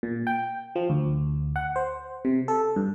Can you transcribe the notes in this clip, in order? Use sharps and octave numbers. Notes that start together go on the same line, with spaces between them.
A#2
G5
F3
D2
F#5
C5
C3
A4
G2